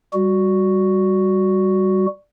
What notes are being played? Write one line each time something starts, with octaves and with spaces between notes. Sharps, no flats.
G3 F#4